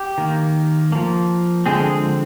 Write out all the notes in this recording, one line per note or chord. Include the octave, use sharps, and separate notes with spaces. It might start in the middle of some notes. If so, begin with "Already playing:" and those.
Already playing: G4
D#3 A#3
F3 A#3
D3 F3 G#3 C4 G#4